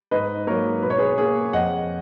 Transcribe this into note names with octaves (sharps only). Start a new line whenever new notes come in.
G#2 B4 D#5
F#3 A#3 A#4 C#5
B2 B4
C#5
G#4 B4
A#3 G#4
F2 D#5 F#5